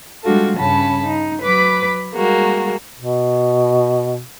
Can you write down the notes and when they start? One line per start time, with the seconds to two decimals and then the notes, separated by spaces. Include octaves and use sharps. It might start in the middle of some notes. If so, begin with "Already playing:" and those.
0.23 G3 G#3 D4 F4 F#4 A4
0.57 G2 C#3 C#4 A5 B5
1.06 D#4
1.42 F#3 B4 B5 D6
2.15 G3 G#3 A#3 F#4
2.99 B2